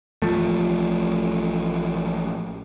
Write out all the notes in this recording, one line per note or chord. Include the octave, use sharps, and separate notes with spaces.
A1 F3 A3